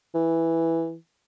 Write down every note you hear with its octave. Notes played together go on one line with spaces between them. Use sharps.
E3